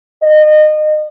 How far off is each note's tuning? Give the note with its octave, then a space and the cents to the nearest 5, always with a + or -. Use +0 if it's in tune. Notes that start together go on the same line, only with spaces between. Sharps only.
D#5 -30